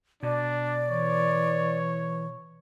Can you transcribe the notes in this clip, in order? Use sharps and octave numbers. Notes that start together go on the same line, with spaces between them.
B2 D4 D5
E3 C#5